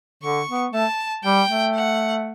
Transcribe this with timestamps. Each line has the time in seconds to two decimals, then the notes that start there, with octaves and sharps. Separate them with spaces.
0.23 D3 C#6
0.49 B3
0.73 A3 A5
1.24 G3 G5
1.49 A3
1.75 F#5